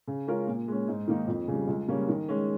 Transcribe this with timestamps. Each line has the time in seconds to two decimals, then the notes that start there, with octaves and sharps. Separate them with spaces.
0.07 C#3
0.27 G#3 C#4 F4 A#4
0.47 A#2
0.68 G#3 C#4
0.88 G#2
1.08 D#3 A#3 D#4
1.27 F2
1.48 C#3 G3
1.68 C#2
1.88 C#3 G3 A#3 C#4
2.09 D#3
2.28 G#3 C#4